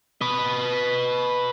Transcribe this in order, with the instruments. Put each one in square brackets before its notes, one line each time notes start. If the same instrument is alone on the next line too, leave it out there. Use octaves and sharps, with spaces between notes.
[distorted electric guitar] B4 D#5